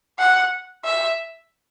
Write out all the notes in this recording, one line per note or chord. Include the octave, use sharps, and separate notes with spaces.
F#5
E5